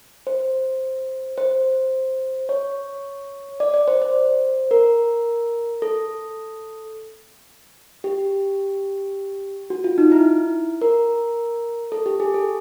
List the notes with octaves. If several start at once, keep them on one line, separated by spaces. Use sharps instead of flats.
C5
C5
C#5
D5
D5
C5
C5
A#4
A4
G4
F#4
F4
D#4
E4
A#4
A4
G4
G#4
A4